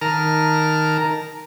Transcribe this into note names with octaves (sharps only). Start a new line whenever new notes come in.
D#3 A#4 A5 A#5 F6